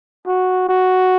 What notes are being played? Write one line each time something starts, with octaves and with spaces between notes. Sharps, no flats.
F#4
F#4